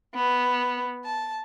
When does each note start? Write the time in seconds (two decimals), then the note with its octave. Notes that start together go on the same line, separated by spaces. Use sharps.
0.15 B3
1.05 A5